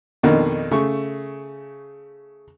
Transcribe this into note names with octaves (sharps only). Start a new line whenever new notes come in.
F2 B2 D#3 A#3 D4
C#3 A3 C#6